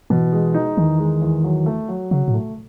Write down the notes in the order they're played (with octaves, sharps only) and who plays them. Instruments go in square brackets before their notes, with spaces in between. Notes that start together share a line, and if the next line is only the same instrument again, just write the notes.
[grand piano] B2 [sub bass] E3
[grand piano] G#3
D#4
[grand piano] E2 [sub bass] D#3
[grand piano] G#3
E2
F#3
A3
F#3
[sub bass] C#3 [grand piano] F#3
[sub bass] A2
[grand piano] A3